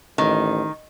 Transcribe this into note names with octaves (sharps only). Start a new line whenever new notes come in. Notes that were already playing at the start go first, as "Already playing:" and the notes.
A1 D#3